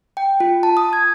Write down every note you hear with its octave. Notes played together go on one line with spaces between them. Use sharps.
G5
F4
A5
D#6
G#6